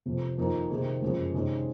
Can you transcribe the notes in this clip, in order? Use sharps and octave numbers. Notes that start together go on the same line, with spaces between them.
F1 F2 C3
F2 D#3 A#3 D#4
C3 D#3 A#3 D#4 G#4
F#1 F2 C#3 G#3
C3 D#3 G#3 C#4